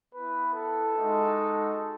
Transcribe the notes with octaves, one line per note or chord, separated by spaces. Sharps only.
B3 E4 B4
A4
G#3 D#4 F#4